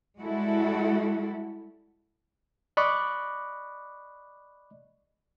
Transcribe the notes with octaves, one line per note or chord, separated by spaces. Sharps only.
G3 G#3 E4 F#4 A4
D5 D#5 B5 C#6 D6 F#6